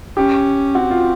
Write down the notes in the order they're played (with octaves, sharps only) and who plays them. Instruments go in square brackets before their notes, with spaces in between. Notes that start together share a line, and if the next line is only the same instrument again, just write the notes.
[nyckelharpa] C#4 [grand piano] G4
[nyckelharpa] C4 [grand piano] F#4
[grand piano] F4